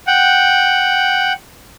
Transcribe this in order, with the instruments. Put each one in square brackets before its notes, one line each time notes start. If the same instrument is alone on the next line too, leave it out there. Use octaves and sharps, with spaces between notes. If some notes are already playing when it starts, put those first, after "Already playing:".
[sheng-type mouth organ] F#5 G5